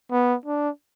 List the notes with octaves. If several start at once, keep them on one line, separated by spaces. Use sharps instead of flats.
B3
D4